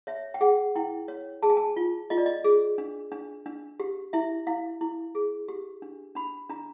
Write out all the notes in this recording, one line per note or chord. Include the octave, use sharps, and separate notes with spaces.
C#5 E5
G5
G#4 F#5
E4 G5
C#5
G#4 A5
G#5
A5
F4
F4 D#5
D5
D#5
G#4
D4
D4
D4
G4
E4 E5
E4 F5
E4
G#4
G4
D4
D4 B5
D4 A#5